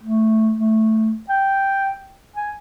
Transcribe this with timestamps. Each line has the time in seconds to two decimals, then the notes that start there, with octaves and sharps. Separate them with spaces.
0.03 A3
0.58 A3
1.29 G5
2.36 G#5